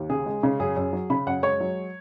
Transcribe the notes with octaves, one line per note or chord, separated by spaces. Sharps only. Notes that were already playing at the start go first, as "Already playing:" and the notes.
Already playing: D#2
C#3 G#4
G#3
C#3
F#2 G#4
F#2
F#3
C#3 B5
F#2 F#5
G#3 C#5
F#3